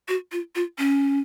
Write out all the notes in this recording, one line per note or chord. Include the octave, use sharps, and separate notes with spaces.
F#4
F4
F4
C#4